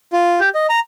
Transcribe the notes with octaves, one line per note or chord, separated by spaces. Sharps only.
F4
G4
D#5
A#5